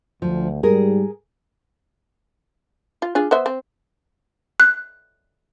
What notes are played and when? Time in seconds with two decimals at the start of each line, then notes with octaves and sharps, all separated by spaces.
0.22 D2 F3
0.63 G#2 G3 G#4 A#4
3.02 F4
3.15 D4 F4 G#4
3.31 B3 C5 E5
3.46 C4
4.60 F#6